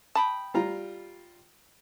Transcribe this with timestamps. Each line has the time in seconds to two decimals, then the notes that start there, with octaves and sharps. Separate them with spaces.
0.15 G5 A5 B5 D#6
0.54 G3 F4 A#5